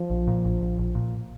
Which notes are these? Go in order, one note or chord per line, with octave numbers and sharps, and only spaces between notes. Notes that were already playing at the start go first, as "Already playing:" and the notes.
Already playing: F3
A#1
A#2
A#1
A#1
A#1
A#2